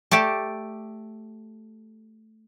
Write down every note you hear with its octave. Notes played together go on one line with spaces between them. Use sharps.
A3 G4 A4 D5